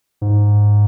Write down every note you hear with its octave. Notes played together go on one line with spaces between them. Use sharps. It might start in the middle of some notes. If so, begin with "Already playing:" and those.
G#2